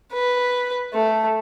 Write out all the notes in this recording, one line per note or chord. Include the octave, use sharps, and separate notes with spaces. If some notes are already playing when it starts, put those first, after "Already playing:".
B4
A3